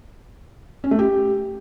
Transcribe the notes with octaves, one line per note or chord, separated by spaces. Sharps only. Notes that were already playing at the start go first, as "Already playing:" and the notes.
C#4
A3
G4